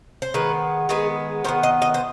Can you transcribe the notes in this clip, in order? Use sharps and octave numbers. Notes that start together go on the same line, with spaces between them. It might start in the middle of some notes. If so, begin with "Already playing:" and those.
C5
D#3 G#3 B3 B4
D#3 G#3 B3 G#4
D#3 G#3 B3 C5
D#5
D#5
C5